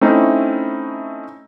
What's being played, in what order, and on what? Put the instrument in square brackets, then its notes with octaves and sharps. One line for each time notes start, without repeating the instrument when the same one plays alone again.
[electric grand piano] A3 C4 C#4 D#4 E4